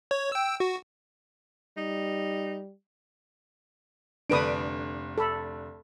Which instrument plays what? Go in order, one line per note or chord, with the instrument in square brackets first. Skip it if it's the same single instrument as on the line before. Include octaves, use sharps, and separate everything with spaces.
[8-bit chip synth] C#5
G5 E6
F#4
[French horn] G3 [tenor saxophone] D#4
[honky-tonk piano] F1 D3 D7 [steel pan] D4 B4 D#6
[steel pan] A4 B5